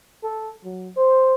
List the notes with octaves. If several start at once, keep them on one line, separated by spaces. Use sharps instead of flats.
A4
F#3
C5